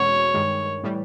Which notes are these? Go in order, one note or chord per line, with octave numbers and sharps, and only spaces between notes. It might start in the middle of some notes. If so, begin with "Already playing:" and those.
Already playing: E2 B2 G#3 C#4 F#4 C#5
G2 D#3 G#3
A2 E3 G3